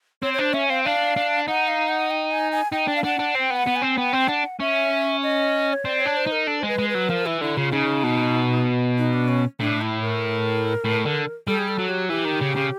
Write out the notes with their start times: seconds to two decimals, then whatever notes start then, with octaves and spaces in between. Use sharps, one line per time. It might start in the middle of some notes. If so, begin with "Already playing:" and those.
0.22 C4 C#5
0.34 C#5
0.38 D4 C5
0.53 C#4 E5
0.69 C4 F5
0.84 D4 F5
1.16 D4
1.48 D#4 F#5
1.68 F5
1.89 F#5
2.11 G5
2.31 G#5
2.52 G#5
2.72 D#4 G5
2.88 D4
2.96 F5
3.04 D4 F#5
3.19 D4
3.35 C4 G5
3.50 B3
3.56 F#5
3.67 B3
3.76 G#5
3.82 C4
3.97 B3 G5
4.13 C4
4.28 D4 F#5
4.60 C#4 E5
5.23 D#5
5.73 C#5
5.85 C4 D5
6.01 C#5
6.06 D4
6.17 C5
6.27 D#4
6.32 A#4
6.47 D4 A4
6.60 C5
6.63 G#3 B4
6.79 G#3
6.89 B4
6.95 F#3
7.09 F3 A#4
7.26 E3 E4
7.41 D3 E4
7.57 C#3 F4
7.72 C#3 D#4
8.04 B2
8.98 D#4
9.13 D4
9.28 C#4
9.60 A2 D4
9.81 E4
10.02 A#4
10.85 A2
11.05 D3
11.48 G3 A4
11.58 G#4
11.68 A4
11.79 F#3
11.89 G4
12.09 E3 G4
12.25 D#3
12.41 C#3
12.56 C#3